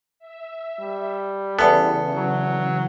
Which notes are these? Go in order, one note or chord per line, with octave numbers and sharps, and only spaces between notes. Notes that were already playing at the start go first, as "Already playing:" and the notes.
E5
G3
E2 C#3 E3 B3 C#4 A4
F#3